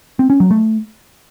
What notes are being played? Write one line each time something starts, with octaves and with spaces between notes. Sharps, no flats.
C4
C#4
F#3
A3